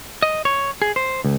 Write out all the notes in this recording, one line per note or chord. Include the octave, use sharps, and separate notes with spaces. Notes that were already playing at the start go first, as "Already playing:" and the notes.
D#5
C#5
G#4
C5
C#2